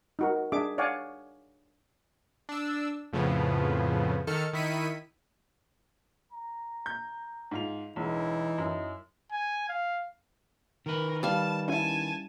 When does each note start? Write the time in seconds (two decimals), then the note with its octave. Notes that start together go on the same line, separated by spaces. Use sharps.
0.19 D#4 F#4 A#4
0.52 D4 G#4 E5 D6
0.78 C#5 D5 F5 F#5 G#5
2.49 D4 E6
3.13 F2 A2 C#3 F3 B3
4.27 D#3 A4 F6 C#7
4.53 D#3 E4 B6 C#7 D#7
6.32 A#5
6.86 G6
7.51 G#2 F4 F7
7.96 E1 E3 D#4
8.58 F#2 E4
9.32 G#5
9.69 F5
10.86 D#3 A#4 B4
11.23 G3 F5 A5
11.68 C#4 E4 G#5 A5